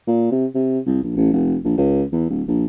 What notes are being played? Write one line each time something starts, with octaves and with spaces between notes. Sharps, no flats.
A#2
C3
C3
C2
A#1
A1
F1
A#1
C#2
E2
D1
A#1